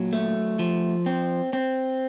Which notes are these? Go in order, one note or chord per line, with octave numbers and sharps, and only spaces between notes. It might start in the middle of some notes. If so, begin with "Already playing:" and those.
Already playing: A#2 F#3
A3
F3
C4
C4